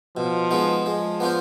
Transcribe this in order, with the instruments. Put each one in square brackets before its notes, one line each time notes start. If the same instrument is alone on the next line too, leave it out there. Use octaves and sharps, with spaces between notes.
[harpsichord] B2 [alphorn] F3
[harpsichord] G#3 B3 D#4
[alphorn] F3 [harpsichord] G#3
[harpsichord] B3 D4 F4 C5